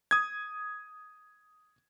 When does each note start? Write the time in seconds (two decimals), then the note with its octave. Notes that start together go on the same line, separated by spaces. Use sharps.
0.11 D#6 G#6